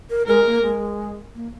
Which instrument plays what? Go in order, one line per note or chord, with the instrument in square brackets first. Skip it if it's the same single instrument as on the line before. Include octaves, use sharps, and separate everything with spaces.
[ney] A#4
[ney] G#3 [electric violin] A#4
[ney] A#3
G#3
A#3